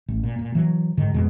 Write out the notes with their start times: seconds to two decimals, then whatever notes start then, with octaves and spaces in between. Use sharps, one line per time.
0.08 A1
0.23 A#2
0.39 A#2
0.55 E3 F#3
0.97 G#2 D3 D#3
1.14 F2 B2 G#3